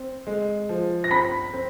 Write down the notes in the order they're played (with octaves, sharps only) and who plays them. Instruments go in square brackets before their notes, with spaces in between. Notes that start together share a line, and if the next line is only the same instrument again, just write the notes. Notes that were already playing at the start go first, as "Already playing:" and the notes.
Already playing: [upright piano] C4
G#3
F3
[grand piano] A#6
[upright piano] C4 [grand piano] B5 B6
[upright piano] C4